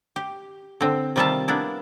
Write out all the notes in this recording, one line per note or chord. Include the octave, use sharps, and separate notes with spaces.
G4
D3 C4
C3 D#3 G3 F4 E5 A5
A#3 B3 D4 E4